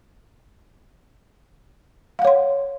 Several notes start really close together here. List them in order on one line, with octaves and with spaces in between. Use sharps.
F5 F#5 C#5 C6